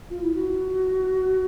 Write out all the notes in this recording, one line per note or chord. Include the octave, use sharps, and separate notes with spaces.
F4
E4
F#4